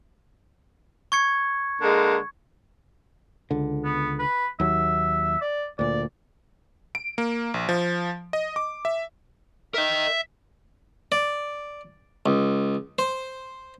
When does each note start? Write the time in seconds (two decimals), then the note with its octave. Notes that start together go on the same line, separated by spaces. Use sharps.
1.12 C#6 G#6 C#7
1.82 D3 G#3 A#3
3.51 C#2 D3
3.85 B3
4.19 B4
4.60 D#2 F#3 E5
5.41 D5
5.79 D2 A#2 D5
6.95 D7
7.18 A#3
7.54 A#1
7.69 F3
8.33 D#5
8.56 D6
8.85 E5
9.74 A#4 D#5 E5
11.12 D5
12.26 C#2
12.99 C5